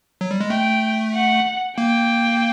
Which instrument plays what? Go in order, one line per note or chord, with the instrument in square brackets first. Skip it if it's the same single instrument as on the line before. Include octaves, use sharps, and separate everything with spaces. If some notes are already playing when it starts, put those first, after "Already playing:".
[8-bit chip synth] F#3
G3
G#3
[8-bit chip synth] A3 [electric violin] G5
[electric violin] F#5
[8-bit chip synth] A#3 [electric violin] G5